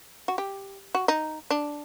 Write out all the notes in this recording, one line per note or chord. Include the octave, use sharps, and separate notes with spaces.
F#4
G4
F#4
D#4
D4